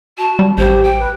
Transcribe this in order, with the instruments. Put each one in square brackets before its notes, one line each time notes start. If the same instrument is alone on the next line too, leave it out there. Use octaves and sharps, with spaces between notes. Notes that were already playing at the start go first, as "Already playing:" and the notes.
[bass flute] F#4 [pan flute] A5
[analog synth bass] G3
[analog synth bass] A1 [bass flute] G4 [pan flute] C5
[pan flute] G5
[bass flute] B4